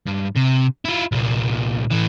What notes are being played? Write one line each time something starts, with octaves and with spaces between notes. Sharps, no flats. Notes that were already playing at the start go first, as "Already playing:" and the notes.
G2
C3
E4 F4
C2 A#2
A2 E3